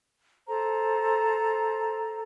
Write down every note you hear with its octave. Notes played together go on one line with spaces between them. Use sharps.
A4 C5 A#5